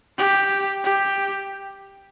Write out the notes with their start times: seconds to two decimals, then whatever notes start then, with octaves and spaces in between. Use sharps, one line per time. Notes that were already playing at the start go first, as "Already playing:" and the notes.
0.18 G4
0.85 G4